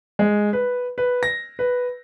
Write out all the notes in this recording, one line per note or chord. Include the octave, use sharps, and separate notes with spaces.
G#3
B4
B4
A#6
B4